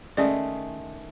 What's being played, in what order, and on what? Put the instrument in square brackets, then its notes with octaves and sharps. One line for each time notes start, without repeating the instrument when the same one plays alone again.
[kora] D#3 G#3 A3 [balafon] C#4 D5